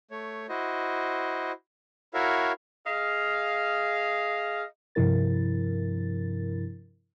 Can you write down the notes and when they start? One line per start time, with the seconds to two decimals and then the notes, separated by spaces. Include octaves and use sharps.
0.11 A3 C#5
0.49 E4 F#4 C5 D#5
2.14 E4 F#4 A#4 C#5 E5 F5
2.87 G#4 D#5 F5
4.95 G2 C3 F3 E4 A#4 A6